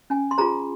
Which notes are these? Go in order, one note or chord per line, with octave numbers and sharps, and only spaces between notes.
C#4 G#5
C6
F4 G#4 C5 A#5